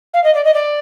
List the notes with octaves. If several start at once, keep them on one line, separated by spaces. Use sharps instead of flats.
F5
D#5
D5
D#5
D5